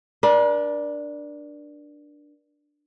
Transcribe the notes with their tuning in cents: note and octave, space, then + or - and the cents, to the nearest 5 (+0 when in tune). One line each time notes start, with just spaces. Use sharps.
D4 +5 A#4 +45